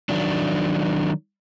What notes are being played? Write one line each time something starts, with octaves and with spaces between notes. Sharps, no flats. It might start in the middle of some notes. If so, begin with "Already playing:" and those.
D#3 F#3 D4